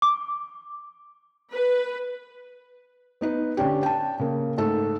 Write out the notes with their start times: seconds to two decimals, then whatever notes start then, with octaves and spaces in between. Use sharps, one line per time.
0.02 D6
1.52 B4
3.21 B3 D#4 B4
3.57 D3 C#4 D4 G4
3.83 G5 A5
4.20 C#3 A#3
4.58 G#2 A3 A4